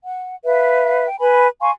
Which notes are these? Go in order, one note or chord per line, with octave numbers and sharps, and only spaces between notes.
F#5
B4 E5 F5
G5
B4 G#5 B5
F5 G#5 C6 C#6